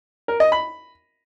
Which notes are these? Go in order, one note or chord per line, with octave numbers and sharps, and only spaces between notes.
A#4
D#5
B5